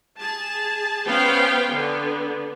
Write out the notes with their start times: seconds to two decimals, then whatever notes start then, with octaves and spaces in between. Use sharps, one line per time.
0.18 G#4 A5
1.06 B3 C#4 C5 F5 G5
1.71 D3 B3